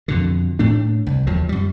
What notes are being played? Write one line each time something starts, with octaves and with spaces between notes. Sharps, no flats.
F2 B2 D3
A2 A3 D4
C2
D#2 D#3 F3 F#3
F#2 G3